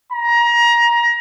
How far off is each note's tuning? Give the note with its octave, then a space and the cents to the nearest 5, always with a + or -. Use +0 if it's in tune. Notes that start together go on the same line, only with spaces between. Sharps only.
A#5 +25